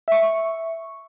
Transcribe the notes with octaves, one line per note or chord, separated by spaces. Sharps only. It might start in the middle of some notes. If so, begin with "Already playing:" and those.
E5 C#6